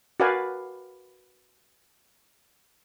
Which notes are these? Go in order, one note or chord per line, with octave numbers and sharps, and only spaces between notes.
F#4 A#4 B4 D5 F5 G#5